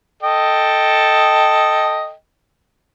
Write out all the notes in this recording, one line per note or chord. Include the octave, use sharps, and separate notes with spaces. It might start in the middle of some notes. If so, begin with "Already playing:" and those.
A4 D#5 G5